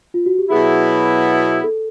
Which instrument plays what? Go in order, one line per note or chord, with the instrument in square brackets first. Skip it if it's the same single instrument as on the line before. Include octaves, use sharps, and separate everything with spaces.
[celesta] F4
F#4
G4
[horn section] B2 F#3 B3 E4 [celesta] G#4
[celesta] A4